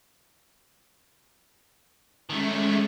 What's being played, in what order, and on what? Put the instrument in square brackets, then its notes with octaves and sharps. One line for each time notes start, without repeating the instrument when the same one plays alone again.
[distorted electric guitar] D#3 A3 [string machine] G#3 C#4 E5